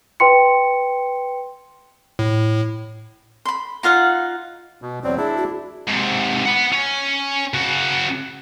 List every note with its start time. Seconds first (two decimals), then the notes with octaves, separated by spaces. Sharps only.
0.20 B4 G5 C6 C#7
2.19 A2
3.45 B5 C6
3.83 D#4 F4 F5 F#5
4.82 B2
5.04 E2 F#3 C4 D5
5.18 D4 E4 G#4
5.37 F#4
5.88 G#2 C3
6.46 F#5 B5
6.72 C#4
7.54 C#3 F#4